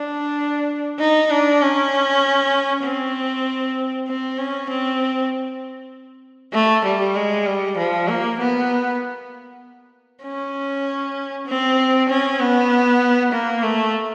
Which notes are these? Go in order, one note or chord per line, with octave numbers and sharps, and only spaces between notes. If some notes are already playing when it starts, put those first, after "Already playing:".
Already playing: D4
D#4
D4
C#4
C4
C4
C#4
C4
A3
G3
G#3
G3
F3
A#3
B3
C#4
C4
C#4
B3
A#3
A3